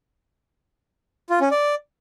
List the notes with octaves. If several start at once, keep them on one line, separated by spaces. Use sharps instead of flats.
F4
C#4
D5